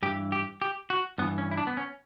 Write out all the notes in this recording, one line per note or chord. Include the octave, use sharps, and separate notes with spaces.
G2 E3 G4
G4
G4
F#4
G2 E3 B3
C#4
E4
D4
B3
C#4